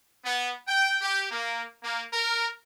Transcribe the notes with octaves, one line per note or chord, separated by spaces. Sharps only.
B3
G5
G4
A#3
A#3
A#4